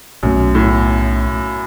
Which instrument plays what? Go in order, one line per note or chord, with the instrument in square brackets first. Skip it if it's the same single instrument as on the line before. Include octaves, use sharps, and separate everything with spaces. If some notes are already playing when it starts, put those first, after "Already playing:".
[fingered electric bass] B1 B2 A3 C#4 [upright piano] F#2
[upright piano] A2